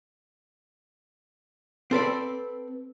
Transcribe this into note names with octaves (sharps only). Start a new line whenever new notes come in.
C4 A4 B4 D5